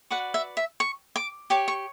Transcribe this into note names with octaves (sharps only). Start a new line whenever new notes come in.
F#4 B4 D5 F#5
E5
E5
C#6
D6
G4 C#5 D6
C#6